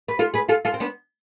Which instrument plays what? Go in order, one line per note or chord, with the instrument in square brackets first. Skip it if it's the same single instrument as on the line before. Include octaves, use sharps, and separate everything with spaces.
[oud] B4
F4 A4
G#4 B4
F4 A4
F4 A4
C4
B3 D4